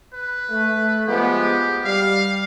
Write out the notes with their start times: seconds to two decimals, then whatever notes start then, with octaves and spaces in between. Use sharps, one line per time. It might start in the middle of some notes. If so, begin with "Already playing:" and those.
0.13 B4
0.49 A3
1.07 F3 G#3 B3 G4
1.85 G3 F5